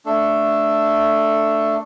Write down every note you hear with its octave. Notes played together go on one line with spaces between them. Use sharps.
A3 D4 A4